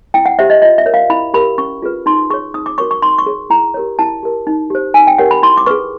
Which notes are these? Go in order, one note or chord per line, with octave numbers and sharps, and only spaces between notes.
E4 G5
F#5
G4 C5 E5
D#5
F4 D#5
E5
A#4 C#5
F5
E4 B5
G4 A#4 B5
C#4 C#6
F4 G#4 B4
D#4 C6
G#4 C#5 C#6
D#4 D#6
D6
F#4 A#4 C#5 C#6
C#6
D#4 C6
C#6
G#4 C#5
E4 A#5
G4 A#4 C#5
E4 A5
G4 A#4
D#4
G4 C5
D#4 G#5
G5
G4 A#4 C#5 F#5
B5
E4 C6
D6
G#4 B4 C#6